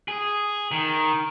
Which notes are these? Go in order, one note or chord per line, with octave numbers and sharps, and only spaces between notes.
G#4
D#3